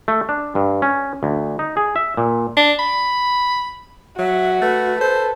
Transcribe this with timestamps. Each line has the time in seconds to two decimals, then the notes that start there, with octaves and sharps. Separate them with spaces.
0.08 A3
0.29 D4
0.55 G2
0.82 C#4
1.23 D2
1.59 D#4
1.77 G#4
1.96 E5
2.17 A#2
2.57 D4
2.79 B5
4.18 F#3 F#4 E5
4.61 A3 B4
5.01 A4 C5